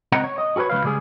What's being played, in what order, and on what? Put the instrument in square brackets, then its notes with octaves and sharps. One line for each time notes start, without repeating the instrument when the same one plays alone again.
[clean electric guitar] C#2 C4 D#5 F#5 G5 A#5
C#5
D#5
F#4 G#4 A#4 B4 C#5
C#2 E3 B4 F5
C#3 G3 G#3 G#4